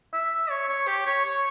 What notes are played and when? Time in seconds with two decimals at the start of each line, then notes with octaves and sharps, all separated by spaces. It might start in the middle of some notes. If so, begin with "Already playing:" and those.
0.13 E5
0.50 C#5
0.68 C#5
0.87 G4
1.06 C#5
1.24 C#5